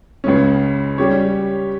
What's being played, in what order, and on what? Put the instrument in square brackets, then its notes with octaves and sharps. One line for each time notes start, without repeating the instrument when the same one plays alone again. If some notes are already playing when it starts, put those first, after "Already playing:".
[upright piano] C#2 C#3 G#3 C#4
G3 C#4 G4 C#5